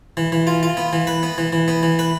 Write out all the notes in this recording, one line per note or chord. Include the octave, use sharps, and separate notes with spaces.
E3
E3
F4
F4
B3
E3
B4
B3
E3
E3
B3
E3
B4